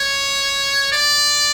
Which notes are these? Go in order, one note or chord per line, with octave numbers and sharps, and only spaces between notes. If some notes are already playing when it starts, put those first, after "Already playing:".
Already playing: C#5
D5